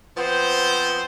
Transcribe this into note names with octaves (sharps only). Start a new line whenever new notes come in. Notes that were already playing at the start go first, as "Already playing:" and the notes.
F3 B3 C4 C5